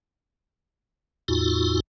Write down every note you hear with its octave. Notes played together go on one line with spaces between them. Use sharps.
E2 A2 D#4 F4 F#4